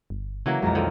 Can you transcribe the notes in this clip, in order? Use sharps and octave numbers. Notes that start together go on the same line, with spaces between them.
G1
C#3 E3 F#3 A#3
B1 F2 G#3 A#5
D3 D#3 F3